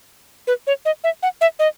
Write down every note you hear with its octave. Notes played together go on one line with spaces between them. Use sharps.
B4
C#5
D#5
E5
F#5
E5
D#5